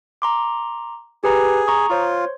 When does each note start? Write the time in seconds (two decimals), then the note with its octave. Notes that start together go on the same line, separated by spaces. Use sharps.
0.22 A#5 C6 D6
1.24 G4 G#4 B4 A#5
1.67 A#5 C#6 D#6
1.90 F4 C5 C#5 C6